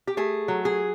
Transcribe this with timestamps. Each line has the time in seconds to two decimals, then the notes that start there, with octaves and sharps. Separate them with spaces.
0.07 G4
0.17 A3 G#4
0.48 F#3
0.65 G#4